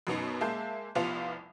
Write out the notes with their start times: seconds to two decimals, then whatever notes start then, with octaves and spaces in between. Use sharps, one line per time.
0.07 F#2 B2 B3 D#4
0.41 G#3 A#3 E5 A5 G6
0.95 F1 C2 F3 B3 F4 F7